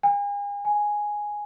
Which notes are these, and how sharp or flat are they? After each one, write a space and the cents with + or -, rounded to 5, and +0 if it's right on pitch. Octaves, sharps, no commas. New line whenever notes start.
G#5 -40
G#5 +0